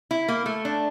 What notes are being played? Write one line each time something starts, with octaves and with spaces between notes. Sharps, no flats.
E4
A#3
A3
D4